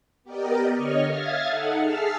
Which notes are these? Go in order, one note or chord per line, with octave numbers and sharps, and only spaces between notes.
B3 G4 A#4 D5 D#5
D3 C#5 D#5 C#6 F6
E5 F5 D#6 F6 G#6 A6
D#4 A4 F#5
G#4 E5 A5 E6 F6 C7